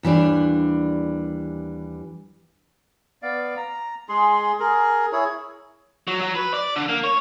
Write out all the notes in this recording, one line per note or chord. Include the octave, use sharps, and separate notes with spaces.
D#2 E3 G3 D4
B3 D5 F5
A#5
G#3 G#4 C6
G#4 A#4
E4 G#4 C#5
F#3
F#3
B4
D5
D3
A#3
C#5